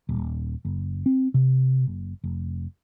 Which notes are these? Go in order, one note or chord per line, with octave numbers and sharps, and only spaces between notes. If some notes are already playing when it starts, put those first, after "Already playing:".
D#1
F#1
C4
C3
F#1
F1